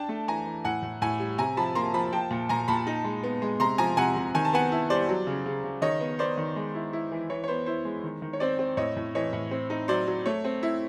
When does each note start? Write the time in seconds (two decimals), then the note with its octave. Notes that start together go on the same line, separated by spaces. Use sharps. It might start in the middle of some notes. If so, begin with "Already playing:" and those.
Already playing: D4 G5 A5
0.09 A3
0.28 E3 G#5 A#5
0.46 E3
0.65 A2 F#5 G#5
0.83 A2
1.02 A2 F#5 G#5
1.20 G3
1.38 C3 G#5 A#5
1.57 F3 A5 B5
1.75 A#3 A#5 C6
1.94 F3 A5 B5
2.12 F3 G5 A5
2.31 A#2
2.49 A#2 G#5 A#5
2.68 A#2 A5 B5
2.87 D#4
3.04 G#3
3.23 B3
3.42 G#3
3.60 C3 A#5 C6
3.78 F3 G#5 A#5
3.97 C3 F#5 G#5
4.16 C3
4.34 D#3 G#5
4.45 A5
4.53 B3 F#5 G#5
4.72 E4
4.90 G3 C5 D5
5.09 F#3
5.27 C#3
5.46 C#3
5.64 C#3
5.81 D#3 C#5 D#5
6.00 B3
6.19 B3 C5 D5
6.37 D#3
6.56 G#3
6.75 E4
6.93 E4
7.12 E3
7.30 E3 C#5
7.44 C#5
7.48 B3 C5
7.66 E4 C5
7.85 G#3
8.04 D#3
8.22 D#3
8.33 C#5
8.40 C4 C5 D5
8.59 C4
8.77 A2 C#5 D#5
8.97 A2
9.15 E3 C#5 D#5
9.33 A2
9.51 C4
9.70 D#4
9.88 F#3 C5 D5
10.07 F#3
10.26 A3 C#5
10.44 C4
10.63 E4